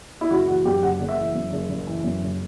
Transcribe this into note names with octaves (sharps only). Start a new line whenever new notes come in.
E4
F#1 F#4
E3 F#4
F#2 G4
F#1 F#5
F#1
E5
E3
F#2
F#1
F#1
E3
F#2
F#1